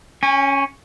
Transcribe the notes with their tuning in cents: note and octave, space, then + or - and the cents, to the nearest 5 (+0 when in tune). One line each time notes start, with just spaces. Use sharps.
C#4 +0 G#5 -40